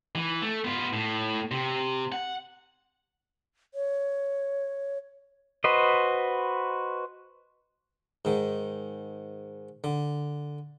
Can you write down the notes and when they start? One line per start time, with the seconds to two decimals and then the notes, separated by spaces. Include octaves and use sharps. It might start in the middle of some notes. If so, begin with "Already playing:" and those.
0.15 E3
0.42 A3
0.64 B3 F4
0.93 A2
1.51 C3
2.12 F#5
3.74 C#5
5.64 F#4 B4 C5 D#5
8.25 G#2 D#3
9.84 D3